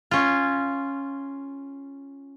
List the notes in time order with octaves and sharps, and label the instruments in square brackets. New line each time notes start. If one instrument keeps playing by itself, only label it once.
[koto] C#4 F4